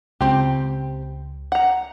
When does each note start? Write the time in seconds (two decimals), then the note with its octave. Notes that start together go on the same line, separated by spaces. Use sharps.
0.21 C#2 C4 G4
1.52 F#5 A#5